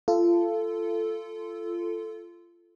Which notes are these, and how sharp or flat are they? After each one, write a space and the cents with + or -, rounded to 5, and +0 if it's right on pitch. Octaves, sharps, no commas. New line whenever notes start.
F4 -25 A4 +0